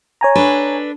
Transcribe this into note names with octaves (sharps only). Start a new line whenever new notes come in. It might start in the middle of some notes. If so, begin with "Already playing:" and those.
C#5 G#5 A#5
D4 A4 B4